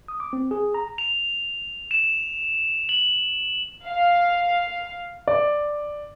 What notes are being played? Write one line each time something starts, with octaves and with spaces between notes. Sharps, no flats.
D#6
D6
C4
G#4
A#5
F7
E7
F#7
F5
D5